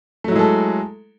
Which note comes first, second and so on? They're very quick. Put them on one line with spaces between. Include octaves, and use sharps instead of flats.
A3 F#3 E4 G#3 A4